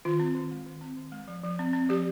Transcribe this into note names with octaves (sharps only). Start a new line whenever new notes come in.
D#3 F4
C4
D#3
G#3
D#3
C4
D#3
G#3
F3
F3
C4
C4
F3 G4